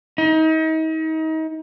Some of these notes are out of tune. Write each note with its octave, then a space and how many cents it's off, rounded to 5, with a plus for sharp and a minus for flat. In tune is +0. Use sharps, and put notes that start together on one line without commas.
D#4 +35